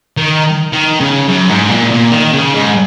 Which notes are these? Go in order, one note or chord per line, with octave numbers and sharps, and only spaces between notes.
D#3
D#3
C#3
F#2
G#2
A#2
A#2
D#3
C#3
G#2